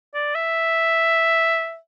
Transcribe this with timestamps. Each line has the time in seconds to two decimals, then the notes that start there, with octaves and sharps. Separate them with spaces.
0.14 D5
0.35 E5